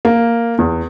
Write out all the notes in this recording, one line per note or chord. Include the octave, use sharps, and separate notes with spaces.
A#3
E2